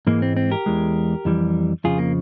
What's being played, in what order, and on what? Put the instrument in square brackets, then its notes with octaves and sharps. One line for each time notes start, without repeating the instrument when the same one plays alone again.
[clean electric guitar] G#2 E3 G#3 A#3
C4
C4
G4 A#4
E2 E3 G#3
F2 E3 G3
F2 C#3 F3 F4 G#4
A#3